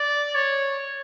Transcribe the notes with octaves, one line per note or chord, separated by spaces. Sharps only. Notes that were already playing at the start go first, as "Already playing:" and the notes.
Already playing: D5
C#5